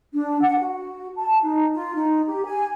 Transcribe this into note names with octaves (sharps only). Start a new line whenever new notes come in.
D4
F#5
F#4
A5
D#4
F4
D#4
G4
G#5